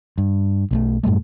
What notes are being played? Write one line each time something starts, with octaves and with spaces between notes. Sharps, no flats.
G2
B1 G3 A3
F#2 A2 G3 A3